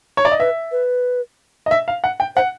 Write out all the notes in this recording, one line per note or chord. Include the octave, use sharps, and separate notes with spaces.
C#5
D5
D#5
B4 E5
B4
D#5
E5
F5
F#5
G5
C5 F#5